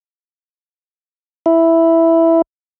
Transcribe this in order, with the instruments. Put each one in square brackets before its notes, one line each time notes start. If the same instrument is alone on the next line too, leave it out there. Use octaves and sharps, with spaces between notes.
[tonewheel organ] E4